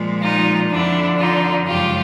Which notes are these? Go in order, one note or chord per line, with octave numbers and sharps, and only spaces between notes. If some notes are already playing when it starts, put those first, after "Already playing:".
Already playing: A#2 F3 G#3
D#4 F4
F2 D3 F3 D4 E4
D#4 F4
F#2 C#3 F3 G#3 F4 G4